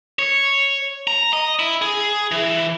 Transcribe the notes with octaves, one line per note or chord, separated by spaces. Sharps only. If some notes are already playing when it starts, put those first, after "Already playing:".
C#5
A#5
D#5
E4
G#4
E3